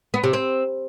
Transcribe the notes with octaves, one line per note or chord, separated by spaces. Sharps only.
B3
C3
C4